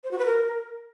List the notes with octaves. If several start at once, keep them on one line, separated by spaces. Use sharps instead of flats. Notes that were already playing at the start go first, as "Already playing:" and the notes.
C5
F#4
B4
A#4